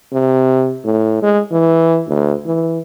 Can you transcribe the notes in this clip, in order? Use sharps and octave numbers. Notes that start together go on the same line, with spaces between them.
C3
A2
G#3
E3
D2
E3